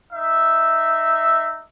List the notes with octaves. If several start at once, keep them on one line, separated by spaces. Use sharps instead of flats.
D#4 E5